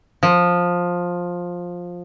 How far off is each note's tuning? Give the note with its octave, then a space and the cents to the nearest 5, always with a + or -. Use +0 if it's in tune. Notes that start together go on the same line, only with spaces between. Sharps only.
F3 +15